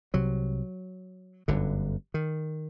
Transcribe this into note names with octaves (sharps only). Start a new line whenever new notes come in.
C2 C3 F#3
G1 F#2 D3
D#3